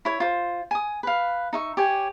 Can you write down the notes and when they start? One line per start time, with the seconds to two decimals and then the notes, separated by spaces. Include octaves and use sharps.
0.05 E4 C#5
0.20 F4 C5
0.71 G#5 D#6
1.03 B4 F5
1.53 D#4 E5 C#6
1.77 G4 C#5 G#5